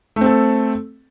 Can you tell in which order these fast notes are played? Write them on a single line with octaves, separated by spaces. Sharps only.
A3 C4 A4